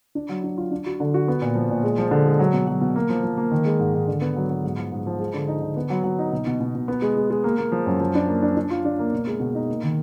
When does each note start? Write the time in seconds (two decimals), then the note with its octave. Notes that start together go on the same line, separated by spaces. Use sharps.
0.15 D4
0.29 F#3
0.43 D4
0.58 F4
0.71 D4
0.86 F#4
1.00 D3
1.14 F#4
1.28 B3
1.41 A#2
1.55 F3
1.70 A#2
1.84 G#3
1.98 F3
2.11 D3
2.26 G#3
2.39 F#3
2.53 B2
2.67 F#3
2.81 B2
2.96 A#3
3.10 F3
3.23 F3
3.37 A#3
3.51 D#3
3.65 G#3
3.80 G#2
3.94 G#2
4.07 D3
4.21 B3
4.36 F#3
4.50 B3
4.64 G#2
4.78 F3
4.92 G#2
5.07 F3
5.20 G#3
5.34 D3
5.48 D#4
5.62 D3
5.77 B3
5.90 F#3
6.04 F#3
6.19 D#4
6.32 B2
6.47 B2
6.61 B2
6.75 B2
6.88 B3
7.02 G#3
7.17 G#3
7.30 G#3
7.44 A#3
7.58 A#3
7.72 F3
7.86 F#2
8.00 F3
8.15 D4
8.28 A#3
8.42 D4
8.57 D4
8.70 F4
8.85 D4
8.99 A#3
9.13 B2
9.27 G#3
9.40 B2
9.55 D#4
9.69 A#3
9.83 D#3